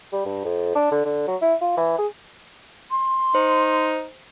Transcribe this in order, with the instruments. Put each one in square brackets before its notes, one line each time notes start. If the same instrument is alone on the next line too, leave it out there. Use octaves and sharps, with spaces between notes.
[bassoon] G3
G2
F2
D4
D3
D3
F#3
E4
F4
E3
G#4
[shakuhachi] C6
[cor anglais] D#4 [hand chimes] C5